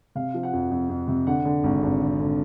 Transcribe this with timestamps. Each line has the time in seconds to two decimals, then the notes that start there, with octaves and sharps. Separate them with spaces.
0.15 C3 F5
0.34 F3
0.43 F#5
0.53 F2
0.71 F2
0.89 F2
1.08 C3
1.27 D3 F#5
1.45 D3
1.64 G#1
1.83 G#1
2.01 D3
2.20 D3